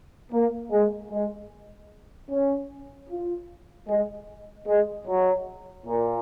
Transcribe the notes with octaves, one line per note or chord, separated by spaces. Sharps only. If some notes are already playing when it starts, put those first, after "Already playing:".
A#3
G#3
G#3
C#4
F4
G#3
G#3
F#3
A#2